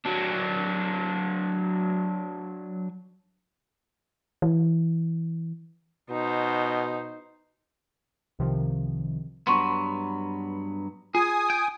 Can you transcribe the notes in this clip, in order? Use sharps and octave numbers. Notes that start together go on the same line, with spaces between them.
F#3 D4
E3
B2 D#4 C5
C2 C3 D#3 F3
G2 F#3 B3 C6 C#6 D#7
F4 G#4 G#5 D#6
G5